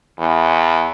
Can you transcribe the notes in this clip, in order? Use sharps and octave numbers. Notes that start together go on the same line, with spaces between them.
E2